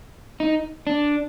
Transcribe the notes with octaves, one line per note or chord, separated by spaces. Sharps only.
D#4
D4